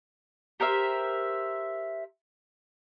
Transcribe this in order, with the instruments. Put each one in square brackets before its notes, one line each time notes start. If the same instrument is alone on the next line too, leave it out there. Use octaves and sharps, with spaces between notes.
[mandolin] G4 A#4 C5 E5